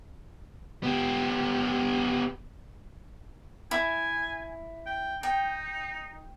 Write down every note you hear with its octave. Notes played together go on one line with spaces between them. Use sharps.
B3 G4
E4 G#5
G5
D#4 G5